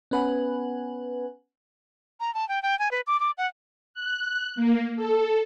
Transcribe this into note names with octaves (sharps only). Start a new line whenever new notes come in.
B3 C#4 B4 F#5 G#5
A#5
A5
G5
G5
G#5
B4
D6
D6
F#5
F#6
A#3
A4